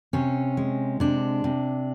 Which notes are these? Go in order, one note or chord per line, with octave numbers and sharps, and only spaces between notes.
C3 C#4
G#3
C3 D4
C3